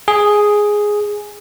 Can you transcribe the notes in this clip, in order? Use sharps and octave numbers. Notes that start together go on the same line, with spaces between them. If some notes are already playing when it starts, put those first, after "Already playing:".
G#4